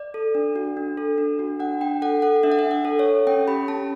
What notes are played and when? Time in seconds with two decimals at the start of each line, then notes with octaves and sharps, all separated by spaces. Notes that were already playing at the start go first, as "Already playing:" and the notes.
Already playing: D5
0.14 A4
0.35 D4
0.56 F#4
0.77 D4
0.97 A4
1.18 D4
1.39 F#4
1.60 D4 F#5
1.81 D4 G5
2.02 A4 F#5
2.22 A4 F#5
2.43 D4 E5
2.52 F#5
2.59 E5
2.64 D4
2.71 F#5
2.85 A4
2.99 C#5
3.06 A4
3.27 C#4 G5
3.48 G4 B5
3.68 C#4 A5